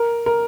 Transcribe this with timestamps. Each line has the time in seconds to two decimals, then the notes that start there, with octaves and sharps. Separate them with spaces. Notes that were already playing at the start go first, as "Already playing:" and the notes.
Already playing: A#4
0.26 A#4